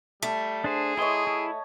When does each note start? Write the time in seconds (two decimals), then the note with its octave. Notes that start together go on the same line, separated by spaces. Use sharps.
0.22 G3 A3
0.64 D4 G#4 C5
0.97 E4 C#5 D#5 G#5 C6
1.27 E4